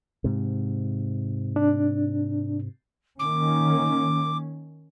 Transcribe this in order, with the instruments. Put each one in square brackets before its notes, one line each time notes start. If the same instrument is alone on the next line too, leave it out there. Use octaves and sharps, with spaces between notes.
[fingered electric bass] G#2 C3
[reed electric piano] D4
[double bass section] D#3 A#3 C#4 [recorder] D6